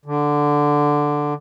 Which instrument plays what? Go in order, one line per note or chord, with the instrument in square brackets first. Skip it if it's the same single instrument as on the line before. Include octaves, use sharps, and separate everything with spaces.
[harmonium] D3